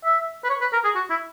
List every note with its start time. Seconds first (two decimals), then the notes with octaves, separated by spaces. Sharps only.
0.04 E5
0.44 B4
0.49 C#5
0.61 B4
0.72 A#4
0.84 G#4
0.95 F#4
1.10 E4